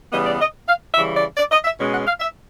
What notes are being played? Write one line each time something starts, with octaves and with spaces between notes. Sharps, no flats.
C#3 E3 G3 B3 D#5
D5
D#5
F5
C#3 E3 G3 E5
D5
D5
D#5
E5
B2 G#3 C#4
F#5
F5
E5